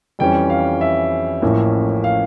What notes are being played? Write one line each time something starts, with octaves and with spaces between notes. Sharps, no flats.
F2 E3 G3 C#4 G5
F5
E5
A1 A2 F3 A#3 C#4
F5